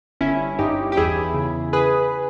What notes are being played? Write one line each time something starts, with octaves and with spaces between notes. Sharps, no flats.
G1 C#4 E4
G2 D#4 G4
G4
E2 E4 G#4
C#3
G#4 B4